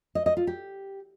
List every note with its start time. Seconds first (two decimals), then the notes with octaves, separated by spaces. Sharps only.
0.15 D#5
0.26 D#5
0.37 F4
0.47 G4